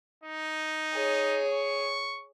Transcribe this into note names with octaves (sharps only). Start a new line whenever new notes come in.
D#4
G#4 C#5
C#6